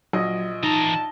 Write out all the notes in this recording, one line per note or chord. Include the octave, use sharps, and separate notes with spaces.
A#1 F#3 D#5
E3 D#4 A5 A#5 A#6 G7